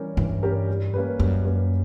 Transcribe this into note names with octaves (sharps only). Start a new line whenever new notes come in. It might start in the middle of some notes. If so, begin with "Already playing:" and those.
Already playing: E3 G3 C#4 G4 A#4
G2 E3
G3 C#4 G4 A#4
G3
A#3 C#4 G4 B4
F#2 G3
A#3 C#4 G4 B4